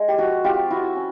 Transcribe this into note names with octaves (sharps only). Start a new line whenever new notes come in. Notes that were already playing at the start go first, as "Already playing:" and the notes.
Already playing: G#3
G4
F3 F#4
C4 F4 G4
E4 F#4
C#4